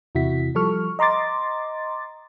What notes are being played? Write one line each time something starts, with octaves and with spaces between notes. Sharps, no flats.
E2 C3 E4 F#4 B6
F3 G3 A4 C#6 F6
D#5 A#5 C6 D6 A6